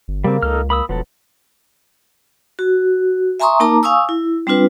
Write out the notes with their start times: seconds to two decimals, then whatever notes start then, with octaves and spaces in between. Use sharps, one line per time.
0.08 G1
0.24 C#3 G3 A#3 C4
0.43 C#2 D#4 A4 F6
0.70 A#3 B5 D#6 E6
0.89 E1 F3 F#3 B3 A4
2.59 F#4
3.40 E5 G#5 A#5 C6 C#6 D#6
3.60 A#3 D#4 A#4 A5 A#5 D6
3.83 F5 G#5 C#6 D#6 E6
4.09 E4
4.47 G3 C4 D4 F4 B4